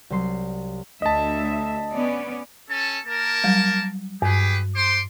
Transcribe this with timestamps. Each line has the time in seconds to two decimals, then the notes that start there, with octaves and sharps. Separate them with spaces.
0.10 C2 F#3 C6 C7
1.02 D2 D#5 E5 A5
1.91 B3 C#4 D5
2.69 C#4 A4 A5
3.05 A#3 A#4 A5
3.44 F#3 G3
4.22 G2 G4 G#4 B4
4.74 C5 C6 D6